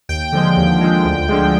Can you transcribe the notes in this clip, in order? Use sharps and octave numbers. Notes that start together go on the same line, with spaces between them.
D#2 G5
D3 F3 G#3
D#2
D3 F3 G#3
D2
D3 F3 G#3